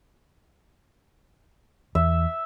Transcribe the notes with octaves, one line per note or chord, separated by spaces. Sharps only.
E2 E5